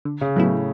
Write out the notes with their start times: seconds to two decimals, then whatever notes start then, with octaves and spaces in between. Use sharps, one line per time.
0.05 D3
0.21 C#3
0.36 A2 F#3 B3 E4